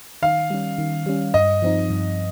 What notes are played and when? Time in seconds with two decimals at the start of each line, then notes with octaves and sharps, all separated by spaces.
0.22 D#3 F5
0.50 G3 C#4
0.78 D#3
1.06 G3 C#4
1.34 G2 D#5
1.62 F3 C4 D#4
1.90 G2